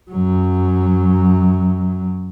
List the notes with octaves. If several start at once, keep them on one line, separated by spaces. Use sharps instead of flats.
F#2 F#3